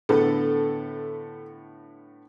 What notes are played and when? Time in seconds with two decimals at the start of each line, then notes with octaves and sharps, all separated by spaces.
0.09 A2 D3 B3 A4